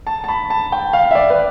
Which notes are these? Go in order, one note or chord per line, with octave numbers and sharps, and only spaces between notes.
A5
A5
B5
A5
G5
F5
E5
D5
B4